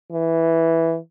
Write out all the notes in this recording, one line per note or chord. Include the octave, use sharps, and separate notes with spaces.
E3